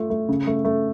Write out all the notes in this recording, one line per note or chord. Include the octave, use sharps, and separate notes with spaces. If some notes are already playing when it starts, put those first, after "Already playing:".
Already playing: A3 F4
A3
C#3
A3
A3